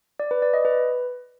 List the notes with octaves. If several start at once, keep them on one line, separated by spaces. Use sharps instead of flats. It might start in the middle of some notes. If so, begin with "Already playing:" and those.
D5
B4
D5
D#5
B4